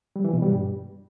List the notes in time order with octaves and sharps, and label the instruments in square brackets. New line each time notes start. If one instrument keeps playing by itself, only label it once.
[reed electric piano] G3
E3
B2
G3
G2